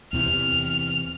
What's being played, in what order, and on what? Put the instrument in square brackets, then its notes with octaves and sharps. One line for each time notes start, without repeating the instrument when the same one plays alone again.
[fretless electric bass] E2 C3 E3 [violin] F6